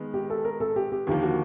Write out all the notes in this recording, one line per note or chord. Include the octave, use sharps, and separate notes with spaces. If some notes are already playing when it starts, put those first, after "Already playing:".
Already playing: D#3 G#3 B3
G4
A4
A#4
A4
G4
G4
D#2 D3 F3 A#3 G4
F#4